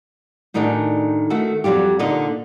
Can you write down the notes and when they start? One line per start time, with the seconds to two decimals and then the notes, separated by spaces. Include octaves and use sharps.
0.54 A2 D#3 D4 D#4 F#4 G#4
1.30 D#3 A3 F#4 A4
1.64 F2 F#3 G3 F4 G4
1.99 A#2 D3 D#4 D#5